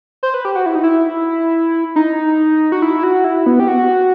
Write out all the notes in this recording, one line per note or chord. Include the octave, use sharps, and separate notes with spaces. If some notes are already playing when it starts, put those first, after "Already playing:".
C5
B4
G4
F#4
E4
D#4
E4
D#4
F#4
E4
F#4
E4
B3
G4
F#4